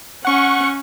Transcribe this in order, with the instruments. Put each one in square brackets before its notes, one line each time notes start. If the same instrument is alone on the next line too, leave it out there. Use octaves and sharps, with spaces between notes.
[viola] C#4 [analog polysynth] F#5 C#6